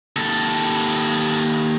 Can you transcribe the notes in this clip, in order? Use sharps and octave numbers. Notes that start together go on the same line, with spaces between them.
D#2 A4